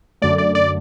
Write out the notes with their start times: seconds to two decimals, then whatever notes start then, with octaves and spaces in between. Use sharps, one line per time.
0.22 F#2 D3 A3 D5
0.38 D5
0.55 D5